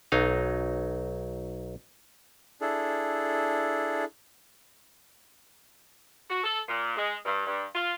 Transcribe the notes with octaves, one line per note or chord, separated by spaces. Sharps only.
B1 F#3 D#4 F5
D4 E4 G#4 A4
F#4
A4
A#2
G#3
G2
G2
F4